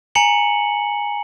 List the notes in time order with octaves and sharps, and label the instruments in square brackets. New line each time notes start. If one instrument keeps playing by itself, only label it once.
[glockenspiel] G#5 A#5 C#7 F#7